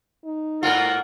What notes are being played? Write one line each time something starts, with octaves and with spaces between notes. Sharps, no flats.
D#4
G#2 A#3 F4 A#4 F#5